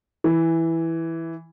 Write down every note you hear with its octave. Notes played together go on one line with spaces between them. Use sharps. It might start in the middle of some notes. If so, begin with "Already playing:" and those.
E3